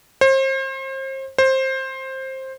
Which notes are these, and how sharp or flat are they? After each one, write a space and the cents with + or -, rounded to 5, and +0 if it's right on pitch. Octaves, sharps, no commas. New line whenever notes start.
C5 +35
C5 +15